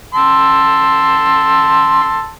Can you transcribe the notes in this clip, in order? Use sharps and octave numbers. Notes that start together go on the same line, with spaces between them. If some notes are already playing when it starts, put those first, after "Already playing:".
A5 C6 E6